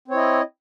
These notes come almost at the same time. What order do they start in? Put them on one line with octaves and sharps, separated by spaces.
C4 C#5 E4 D#5